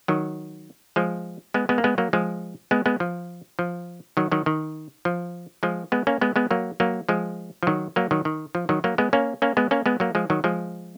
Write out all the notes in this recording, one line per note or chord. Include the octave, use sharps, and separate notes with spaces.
D#3 F#3
F3 G#3
G#3 B3
G#3 B3
A#3
G#3 B3
F#3 A#3
F3 G#3
G#3 B3
G#3 B3
F3
F3
D#3 F#3
D#3 F#3
D#3
F3
F3 G#3
G#3 B3
A#3 C#4
G#3 B3
G#3 B3
F#3 A#3
F#3 A#3
F3 G#3
F3
D#3 F#3
F#3 A#3
D#3 F#3
D#3
F3
D#3 F#3
F#3 A#3
G#3 B3
A#3 C#4
A#3 C#4
G#3 B3
A#3 C#4
G#3 B3
F#3 A#3
F3 G#3
D#3 F#3
F3 G#3